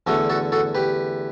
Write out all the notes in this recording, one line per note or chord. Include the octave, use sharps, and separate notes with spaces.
E2 D3 A3 D4 F#4
F#4 A4
F#4 A4
G4 B4